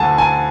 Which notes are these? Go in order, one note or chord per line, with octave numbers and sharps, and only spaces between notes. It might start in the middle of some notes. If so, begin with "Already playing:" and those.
Already playing: D2 D3 G#5 A5
G#5